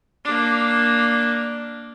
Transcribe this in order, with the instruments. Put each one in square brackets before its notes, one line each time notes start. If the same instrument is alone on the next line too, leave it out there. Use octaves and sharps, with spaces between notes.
[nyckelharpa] A#3 D4